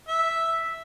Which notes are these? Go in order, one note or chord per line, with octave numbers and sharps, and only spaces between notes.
E5